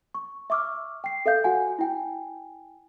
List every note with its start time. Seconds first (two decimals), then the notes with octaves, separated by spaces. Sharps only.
0.15 C#6
0.50 E5 C#6 D6 E6 F6
1.04 G5 C7
1.26 A4 E5 F5 G6
1.44 F#4 F#5 G#5
1.79 E4 G5 G#5